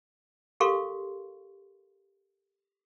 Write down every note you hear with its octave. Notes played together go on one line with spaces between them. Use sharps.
G4 A4 A#4 F5 C6 C#6